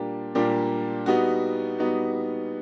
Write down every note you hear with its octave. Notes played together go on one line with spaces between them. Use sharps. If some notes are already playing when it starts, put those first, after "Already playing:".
Already playing: A#2 G3 A#3 D4 G4
A#2 G3 A#3 D4 G4
G3 B3 D#4 F#4
G3 B3 D#4 F#4